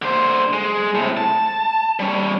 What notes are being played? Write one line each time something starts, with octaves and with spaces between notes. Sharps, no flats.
D3 C5
G#3
A2 C3
A5
G3 C#4